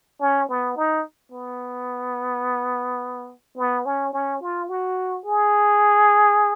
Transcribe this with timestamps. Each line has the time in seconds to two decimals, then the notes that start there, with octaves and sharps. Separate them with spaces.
0.21 C#4
0.49 B3
0.77 D#4
1.32 B3
3.57 B3
3.86 C#4
4.13 C#4
4.42 F4
4.69 F#4
5.25 G#4